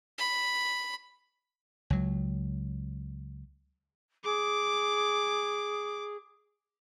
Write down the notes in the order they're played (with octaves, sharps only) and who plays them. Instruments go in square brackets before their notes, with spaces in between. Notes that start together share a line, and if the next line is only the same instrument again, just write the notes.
[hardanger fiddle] B5
[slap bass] C#2 F#3
[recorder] G#4 [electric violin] D6